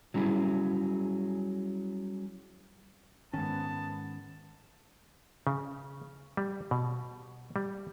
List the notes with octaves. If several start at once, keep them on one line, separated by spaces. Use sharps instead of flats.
F#3 G3 C#4 E4 G#4
G#2 D#3 B3 C#4 A5
C#3
G3
B2
G3